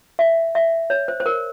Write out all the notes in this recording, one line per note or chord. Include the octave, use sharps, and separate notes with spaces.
E5
E5
C#5
C5
C5
A#4